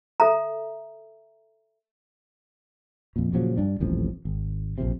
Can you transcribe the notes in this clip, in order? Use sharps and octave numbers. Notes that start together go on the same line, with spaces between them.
A4 E5 A#5
F2 A#2
A#2 C#3 F3 F#3
G2 D4
D#1 A1 F2
G#1
A#1 F2 C3